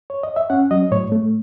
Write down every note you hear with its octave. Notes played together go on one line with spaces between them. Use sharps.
C#5
D#5
E5
C#4 F#5
F#3 D#5
A2 C#5
A3